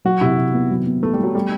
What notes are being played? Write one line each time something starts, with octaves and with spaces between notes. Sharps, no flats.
F#3 F#4
C3 E4
C3
B3
F#3
B3
A3 B3
G3
F#3 B3
G3 A3